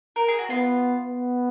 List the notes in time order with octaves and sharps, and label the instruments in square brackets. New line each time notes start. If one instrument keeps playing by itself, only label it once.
[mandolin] A#4
G#4
F#4
[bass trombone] B3 [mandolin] F4
[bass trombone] B3